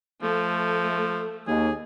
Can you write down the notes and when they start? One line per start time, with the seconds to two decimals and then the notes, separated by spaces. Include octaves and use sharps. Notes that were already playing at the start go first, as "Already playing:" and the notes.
0.23 F3 A3
1.47 D#2 G#4